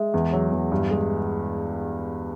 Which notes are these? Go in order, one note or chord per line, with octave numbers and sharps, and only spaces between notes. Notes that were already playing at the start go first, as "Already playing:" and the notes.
Already playing: G#3 E5
E2
F#3
E2
G2
G#3